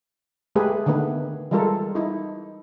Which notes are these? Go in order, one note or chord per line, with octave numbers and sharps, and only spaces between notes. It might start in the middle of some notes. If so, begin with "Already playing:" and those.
G#3 A3 G4 G#4 B4
D3 D#3 A3 B3 B4
E3 G3 G#3 F4 A4 A#4
D#4 E4